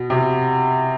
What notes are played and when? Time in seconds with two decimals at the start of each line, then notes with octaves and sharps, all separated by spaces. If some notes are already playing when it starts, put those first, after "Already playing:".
Already playing: B2
0.10 C3